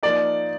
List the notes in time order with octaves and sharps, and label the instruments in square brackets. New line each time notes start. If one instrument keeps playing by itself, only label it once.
[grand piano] F3 A#3 D#4 D5